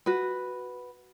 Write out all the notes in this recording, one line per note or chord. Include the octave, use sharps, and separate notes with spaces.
F#4 B4